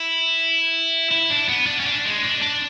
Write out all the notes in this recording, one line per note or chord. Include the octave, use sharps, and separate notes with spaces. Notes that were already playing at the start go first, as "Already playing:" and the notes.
Already playing: E4
E4
D4
B3
D4
C#4
D4
G#3
D4
D4